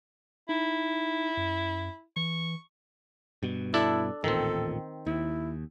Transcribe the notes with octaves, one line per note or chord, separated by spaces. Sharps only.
D#4 E4
F#2
E3 C#6
G2 B2
D4 E4 A4
A1 D#2 A#2 D#3 C4 A4
D#2 E4